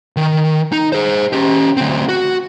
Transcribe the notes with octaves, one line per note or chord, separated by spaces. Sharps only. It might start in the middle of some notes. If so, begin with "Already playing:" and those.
D#3
D#4
G#4 C5
C#4 G4
D2 C4
F#4